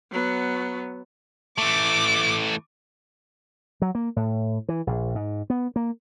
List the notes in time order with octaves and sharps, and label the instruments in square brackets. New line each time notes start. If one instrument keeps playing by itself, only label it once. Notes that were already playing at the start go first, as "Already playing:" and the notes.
[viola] F#3 B3
[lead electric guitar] E3 A3 [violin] D6
[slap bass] F#3
A#3
A2
E3
A#1
G#2
B3
A#3